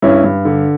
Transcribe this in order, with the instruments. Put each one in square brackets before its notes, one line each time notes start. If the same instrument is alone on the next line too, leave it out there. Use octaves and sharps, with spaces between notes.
[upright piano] G2 C#4 E4
G2
D3